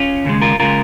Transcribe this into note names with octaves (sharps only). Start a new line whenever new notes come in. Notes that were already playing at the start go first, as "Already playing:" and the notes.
Already playing: C#4 F4
D#2 C#3 G#3
F4 A#4
C#3 G#3 F4 A#4